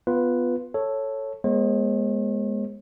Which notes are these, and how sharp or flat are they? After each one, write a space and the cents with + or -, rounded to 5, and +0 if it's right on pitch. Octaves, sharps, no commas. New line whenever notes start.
B3 +10 F4 +0 B4 +0
A4 +0 C#5 -5
G#3 +0 B3 -35 C#5 -45